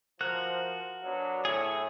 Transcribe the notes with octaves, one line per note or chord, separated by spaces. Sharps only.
F3 F#4 A#4 F#6
F#3 B3 D4
A2 G#4 A4